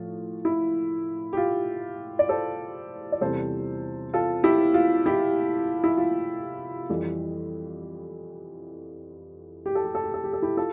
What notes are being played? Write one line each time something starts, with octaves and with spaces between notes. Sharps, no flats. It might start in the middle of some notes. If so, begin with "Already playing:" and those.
Already playing: A2 F3 A3 F4
E4
G4
F4
D5
A4 C5
D5
E2 C3 G3 A4 C5
F4 A4
E4 G4
F4
E4 G4
E4
F4
F2 E3 G3
G4
A4
G4
A4
G4
A4
G4
A4
E4 G4
F4 A4